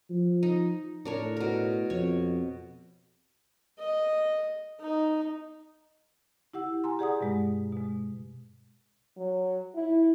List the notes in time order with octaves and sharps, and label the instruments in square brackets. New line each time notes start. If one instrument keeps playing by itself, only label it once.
[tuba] F3
[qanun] D#4
[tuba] A2 [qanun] D4 A#4 C#5
[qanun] B2 A#4
[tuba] F2 [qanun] C#5
[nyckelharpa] D#5
D#4
[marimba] E4 G4 F#5 E6
G#5 A#5 C6
G4 G#4 D5 F#5 A#5 D#6
G2 B2 G#3
B2 G#3
[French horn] F#3
E4